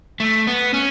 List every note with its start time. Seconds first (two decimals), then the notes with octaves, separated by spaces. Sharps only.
0.20 A3
0.47 B3
0.74 C#4